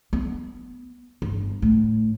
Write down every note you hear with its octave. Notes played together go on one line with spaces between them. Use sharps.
B3
G1
A2